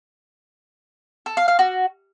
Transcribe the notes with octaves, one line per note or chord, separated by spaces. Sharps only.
A4
F5
F5
F#4